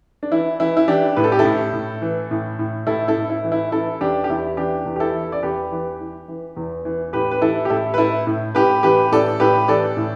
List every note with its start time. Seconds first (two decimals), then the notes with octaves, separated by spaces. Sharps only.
0.23 D4
0.31 E3 E4
0.60 E3 E4
0.77 E4
0.88 E3 D4 G4
1.16 A2 B4
1.24 A4
1.32 G4
1.39 E4 A4
1.45 A2
1.73 A2
2.02 E3
2.31 A2
2.59 A2
2.87 A2 E4 A4
3.08 E4 A4
3.16 A2
3.30 E4
3.44 E3
3.52 E4
3.72 E3 E4 A4
4.01 E2 D4 G4
4.24 G4
4.29 E2 E4
4.57 E3 D4 G4
4.86 E2
4.96 G4
5.00 E4 A4
5.14 E3
5.32 D5
5.42 E2 G4 B4
5.72 E3
6.00 E3
6.28 E3
6.57 E2
6.85 E3
7.13 A2 G4 B4
7.31 B4
7.42 E3 E4 A4
7.65 G4
7.70 A2 E4 A4
7.94 B4
7.98 A2 E4 A4
8.27 A2
8.55 A2 G4 B4
8.83 E3 G4 B4
9.12 A2 A4 D5
9.40 A2 G4 B4
9.68 E3 A4 D5
9.97 A2